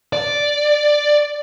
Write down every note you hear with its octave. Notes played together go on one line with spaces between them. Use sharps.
D5